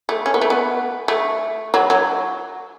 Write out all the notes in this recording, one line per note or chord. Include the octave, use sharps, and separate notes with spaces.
A3
C#4
B3
A3
B3
A3
F#3
F#3